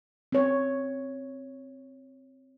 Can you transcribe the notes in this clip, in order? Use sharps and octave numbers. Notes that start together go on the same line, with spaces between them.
C4 C#5